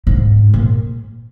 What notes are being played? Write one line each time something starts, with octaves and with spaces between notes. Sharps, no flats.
G#2
A#2